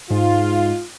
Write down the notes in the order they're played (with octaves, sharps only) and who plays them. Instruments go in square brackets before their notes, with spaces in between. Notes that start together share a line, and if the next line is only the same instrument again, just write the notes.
[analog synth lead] G#2 [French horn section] F4